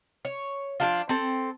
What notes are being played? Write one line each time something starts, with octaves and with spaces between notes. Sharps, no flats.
C#5
F3 D4 F4
C4 A4